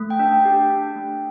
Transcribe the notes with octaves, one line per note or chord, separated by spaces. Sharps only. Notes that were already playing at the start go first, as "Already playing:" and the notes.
Already playing: A3
G5
D4
G5
G4 G5
D4
A3